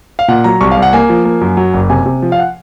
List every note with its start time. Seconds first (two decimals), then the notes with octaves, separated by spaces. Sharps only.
0.19 F5
0.28 A#2 F#5
0.44 F#3 A#5
0.61 C2 C#6
0.71 F5
0.77 C2
0.82 F#5
0.93 A#3 G#5
1.09 F3
1.25 A#3
1.41 F#2
1.57 F#3
1.74 F#1
1.90 C3 G#5
2.06 C3
2.22 F3
2.32 F5
2.39 F#5